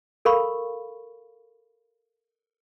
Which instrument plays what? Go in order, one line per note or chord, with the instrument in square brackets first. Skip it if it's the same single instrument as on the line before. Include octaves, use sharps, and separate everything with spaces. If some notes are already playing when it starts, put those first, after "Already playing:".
[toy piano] A4 A#4 F5 B5 C#6